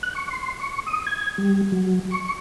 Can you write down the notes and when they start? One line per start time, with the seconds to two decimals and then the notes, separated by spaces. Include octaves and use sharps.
0.03 F#6
0.15 C#6
0.30 C6
0.60 C#6
0.86 D#6
1.07 G#6
1.38 G3
1.72 F#3
2.11 C#6